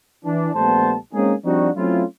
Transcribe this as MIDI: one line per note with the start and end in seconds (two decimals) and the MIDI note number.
0.25 0.50 52
0.25 0.50 62
0.55 0.96 34
0.55 0.96 55
0.55 0.96 57
0.55 0.96 59
0.55 0.96 72
0.55 0.96 81
1.14 1.34 56
1.14 1.34 58
1.14 1.34 60
1.14 1.34 61
1.14 1.34 63
1.14 1.34 68
1.45 1.70 53
1.45 1.70 55
1.45 1.70 60
1.45 1.70 62
1.45 1.70 63
1.45 1.70 66
1.76 2.04 54
1.76 2.04 57
1.76 2.04 60
1.76 2.04 61
1.76 2.04 64
1.76 2.04 65